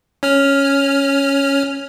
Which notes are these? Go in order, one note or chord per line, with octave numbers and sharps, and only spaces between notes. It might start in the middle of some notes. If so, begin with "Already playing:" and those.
C#4 F6